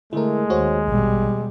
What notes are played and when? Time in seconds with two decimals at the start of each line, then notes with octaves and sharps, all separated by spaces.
0.13 D3 G#3 A3 E4 A#4
0.50 D#2 F#4 C5 C#5
0.87 A#1 B2 G3